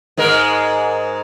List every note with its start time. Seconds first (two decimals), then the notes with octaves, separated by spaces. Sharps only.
0.17 G#2 G#3 A#4